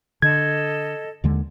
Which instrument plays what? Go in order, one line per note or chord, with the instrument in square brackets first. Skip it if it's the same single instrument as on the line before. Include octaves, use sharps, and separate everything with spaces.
[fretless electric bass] D3 [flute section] A4 D#5 [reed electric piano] G#6
[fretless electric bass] D#2 D3 G#3